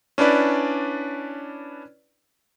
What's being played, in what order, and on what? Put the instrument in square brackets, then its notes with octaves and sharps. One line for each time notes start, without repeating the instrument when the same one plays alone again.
[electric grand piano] C#4 D4 E4 B4 D5